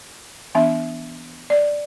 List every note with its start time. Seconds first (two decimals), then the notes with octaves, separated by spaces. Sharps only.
0.55 E3 B3 D4 E5
1.50 D5